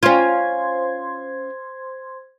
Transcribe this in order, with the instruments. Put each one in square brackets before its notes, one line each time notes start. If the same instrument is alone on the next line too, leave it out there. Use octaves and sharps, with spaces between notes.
[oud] C#4 F4 [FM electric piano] C5 C6 G#6